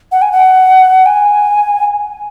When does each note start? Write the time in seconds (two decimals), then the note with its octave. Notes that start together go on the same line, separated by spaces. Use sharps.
0.12 F#5
0.22 G#5
0.32 F#5
1.06 G#5